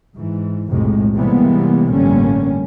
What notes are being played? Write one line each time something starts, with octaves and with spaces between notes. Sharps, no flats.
G#2 E3
B1 F2 A2 C3 G#3
C3 E3 G3 G#3 A#3 B3
A1 G2 D3 G3 A#3 C#4